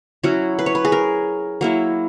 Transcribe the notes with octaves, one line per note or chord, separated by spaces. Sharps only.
F#3 C#4 E4 F#4
B4
C#5
B4
G#4
A#4
F#3 A#3 E4